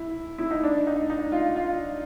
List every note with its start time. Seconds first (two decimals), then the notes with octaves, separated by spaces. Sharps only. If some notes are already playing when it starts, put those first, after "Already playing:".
Already playing: E4
0.38 E4
0.51 D#4
0.63 D4
0.87 D#4
1.10 D#4
1.32 F4
1.56 F4